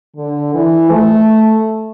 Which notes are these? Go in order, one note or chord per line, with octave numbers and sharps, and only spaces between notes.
D3
E3
A3